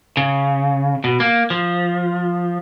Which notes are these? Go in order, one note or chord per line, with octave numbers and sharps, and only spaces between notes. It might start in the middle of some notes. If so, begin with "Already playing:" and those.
C#3
B2
A#3
F3